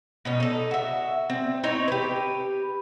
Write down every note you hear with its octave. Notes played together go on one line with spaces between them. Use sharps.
B2 C#4 D#4
D#4 A4
F#4 E5
C4
C4 D#4 E4 C#5
G4 B4